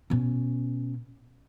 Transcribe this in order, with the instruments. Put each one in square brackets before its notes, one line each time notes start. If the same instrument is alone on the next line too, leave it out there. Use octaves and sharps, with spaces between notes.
[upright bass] B2 C#4